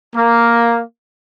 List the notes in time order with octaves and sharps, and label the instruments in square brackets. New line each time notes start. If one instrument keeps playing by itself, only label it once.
[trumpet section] A#3